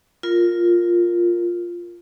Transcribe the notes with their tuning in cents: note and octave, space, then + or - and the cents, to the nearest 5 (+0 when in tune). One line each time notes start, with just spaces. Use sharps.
F4 +0 A#4 +0